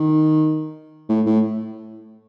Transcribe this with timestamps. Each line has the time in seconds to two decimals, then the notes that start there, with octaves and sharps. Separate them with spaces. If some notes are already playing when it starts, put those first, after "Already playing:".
Already playing: D#3
1.09 A2
1.26 A2